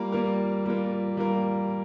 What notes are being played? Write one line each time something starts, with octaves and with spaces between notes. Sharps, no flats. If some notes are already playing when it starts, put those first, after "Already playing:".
Already playing: G3 A#3 F4 A#4
G3 A#3 F4 A#4
G3 A#3 F4 A#4
G3 A#3 F4 A#4